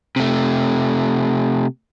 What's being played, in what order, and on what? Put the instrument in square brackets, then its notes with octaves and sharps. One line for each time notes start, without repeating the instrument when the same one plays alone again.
[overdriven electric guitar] C3 A3